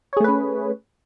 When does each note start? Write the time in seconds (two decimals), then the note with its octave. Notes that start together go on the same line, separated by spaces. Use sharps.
0.13 C#5
0.17 G#4
0.20 A3
0.24 B4
0.28 C#4